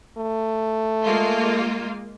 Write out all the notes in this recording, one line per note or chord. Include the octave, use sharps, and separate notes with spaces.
A3
G#3 A#3 F4